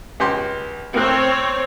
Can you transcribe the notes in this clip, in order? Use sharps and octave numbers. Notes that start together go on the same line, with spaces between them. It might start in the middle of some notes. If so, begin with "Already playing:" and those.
C#2 G4 C6
A2 C4 A#4 C#5 F#6